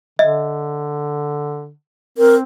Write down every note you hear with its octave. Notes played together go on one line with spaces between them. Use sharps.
D3 D#5 E5
C4 A#4